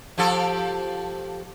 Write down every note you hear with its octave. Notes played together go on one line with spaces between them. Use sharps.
F3 G4 A4